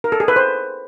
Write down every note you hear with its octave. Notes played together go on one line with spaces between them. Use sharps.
A#4
A4
G#4
B4
C5